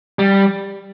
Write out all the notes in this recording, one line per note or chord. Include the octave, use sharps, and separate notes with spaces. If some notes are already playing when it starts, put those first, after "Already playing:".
G3